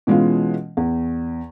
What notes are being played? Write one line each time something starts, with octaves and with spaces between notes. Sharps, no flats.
B2 E3 G#3 C#4 F4
E2